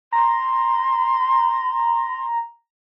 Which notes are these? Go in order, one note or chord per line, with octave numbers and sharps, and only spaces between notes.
A#5 C6